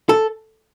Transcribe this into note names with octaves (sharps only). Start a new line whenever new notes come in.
A4